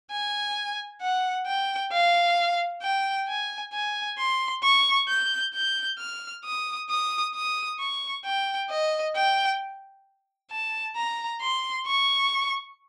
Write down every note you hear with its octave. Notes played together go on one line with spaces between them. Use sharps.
G#5
F#5
G5
F5
G5
G#5
G#5
C6
C#6
G6
G6
F6
D#6
D#6
D#6
C#6
G5
D#5
G5
A5
A#5
C6
C#6